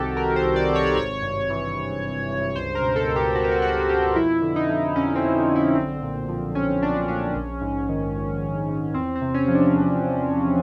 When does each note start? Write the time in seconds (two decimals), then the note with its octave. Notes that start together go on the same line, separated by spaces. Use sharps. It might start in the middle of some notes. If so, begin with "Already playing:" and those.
Already playing: C2 C3 D#3 F#4 G4 A4
0.16 C2 A#4
0.36 C5
0.43 C2
0.56 D5
0.69 C3
0.75 C#5
0.87 D5
0.96 G#1 C#5
1.22 G2
1.50 E3
1.76 G#1
2.03 G#1
2.29 G2
2.56 C#2 C5
2.75 A#4
2.82 B2
2.96 A4
3.09 C#2
3.16 G4
3.35 B2 F#4
3.44 G4
3.51 F#4
3.62 C#2 F#4
3.89 B2 G4
4.15 F2 E4
4.42 D3
4.56 D#4
4.69 F3
4.96 F2 C#4
5.15 C4
5.21 F2
5.48 D3
5.55 E4
5.75 B1 C4
6.02 A#2
6.29 F3
6.55 B1 C#4
6.82 B1 D4
7.08 A#2 C#4
7.36 A#1
7.61 G#2
7.89 D#3
8.15 A#1
8.42 A#1
8.68 G#2
8.94 E2 C4
9.15 C4
9.21 C3
9.34 C#4
9.48 F3
9.55 D4
9.75 E2
10.01 E2
10.28 C3